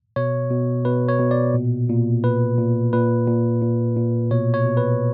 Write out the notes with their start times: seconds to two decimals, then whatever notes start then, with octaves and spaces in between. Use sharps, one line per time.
0.16 B2 C#5
0.51 B2
0.85 B2 B4
1.08 C#5
1.20 B2
1.31 D5
1.54 A#2
1.89 A#2
2.24 A#2 B4
2.59 A#2
2.93 A#2 B4
3.27 A#2
3.62 A#2
3.96 A#2
4.31 B2 C#5
4.54 C#5
4.66 B2
4.77 B4